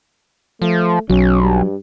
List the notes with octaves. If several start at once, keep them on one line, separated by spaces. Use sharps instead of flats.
F3 A3
B1 F#3 C#4
G2